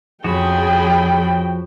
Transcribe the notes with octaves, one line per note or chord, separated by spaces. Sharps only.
F2 C#3 F3 F#4 G#4 G5 B5